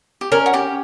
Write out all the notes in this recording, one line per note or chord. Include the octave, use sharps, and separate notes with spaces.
G4
C#4 A#4
F#4
C#4 G4